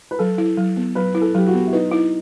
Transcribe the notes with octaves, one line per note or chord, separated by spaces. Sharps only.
B4
F#3 A4
E4
F#3
B3
F#3 B4
E4
A4
F#3 G4
F#4
B3
E4
D#4 B4
E4